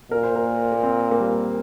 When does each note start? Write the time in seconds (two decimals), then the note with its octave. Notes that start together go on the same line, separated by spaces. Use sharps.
0.11 A#2 A#4
0.23 C5
0.36 A#4
0.72 A#3
0.83 C4
1.11 A#3
1.20 G3